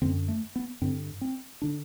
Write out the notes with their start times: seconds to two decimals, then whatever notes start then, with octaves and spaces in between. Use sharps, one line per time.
0.02 F#2 D3 C4
0.28 A3
0.56 B3
0.82 G2 D3 C4
1.21 C4
1.62 D3 D4